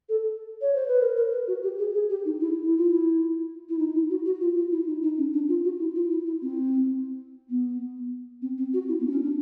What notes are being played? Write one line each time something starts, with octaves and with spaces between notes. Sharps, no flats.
A4
C#5
C5
B4
A#4
A#4
B4
F#4
G4
G#4
G#4
G4
D#4
E4
E4
F4
E4
E4
D#4
E4
F#4
F#4
F4
F4
E4
D#4
D#4
C#4
D4
F4
F#4
E4
F4
E4
E4
C4
B3
C4
C4
F#4
E4
B3
D4
C#4
D4